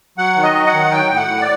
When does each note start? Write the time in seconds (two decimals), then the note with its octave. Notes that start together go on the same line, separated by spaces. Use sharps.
0.18 F#3 F#5
0.36 D#3
0.43 D#5
0.55 F#3
0.67 F#5
0.73 D#3
0.91 F#3 G5
1.10 A2
1.16 F#5
1.28 A2
1.41 D5